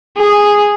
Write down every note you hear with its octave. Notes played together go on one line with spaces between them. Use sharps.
G#4